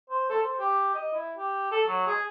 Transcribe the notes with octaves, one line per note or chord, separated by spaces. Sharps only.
C5
A4
C5
G4
D#5
E4
G4
A4
F#3
G#4